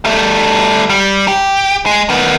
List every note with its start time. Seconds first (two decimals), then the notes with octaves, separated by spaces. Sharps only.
0.05 G3 A3
0.90 G3
1.28 G4
1.86 G#3
2.10 D#3 B3